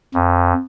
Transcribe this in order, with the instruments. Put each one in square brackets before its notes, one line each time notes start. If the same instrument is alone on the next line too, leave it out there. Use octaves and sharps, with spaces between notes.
[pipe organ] F2